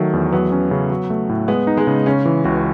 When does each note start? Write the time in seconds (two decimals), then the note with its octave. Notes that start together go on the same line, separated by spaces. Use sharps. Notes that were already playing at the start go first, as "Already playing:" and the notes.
Already playing: D#3 F#3 A3
0.13 E2
0.32 F#3 B3
0.52 C#4
0.71 C#3
0.90 F#3
1.10 A3
1.29 A2
1.48 G#3 B3
1.67 D#4
1.77 G#3
1.87 C#3
2.06 C#3 C#4
2.25 E3
2.44 C#2 F#4